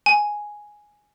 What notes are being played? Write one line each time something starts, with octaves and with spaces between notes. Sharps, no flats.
G#5